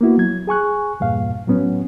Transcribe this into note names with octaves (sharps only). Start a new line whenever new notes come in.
A#3 B3 E4 F#4
F#3 G#6
G#4 G#5 C#6 F#6
E2 G2 A#2 F5
A2 F#3 B3 C#4